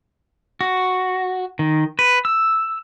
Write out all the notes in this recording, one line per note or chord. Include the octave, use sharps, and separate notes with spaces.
F#4
D#3
B4
E6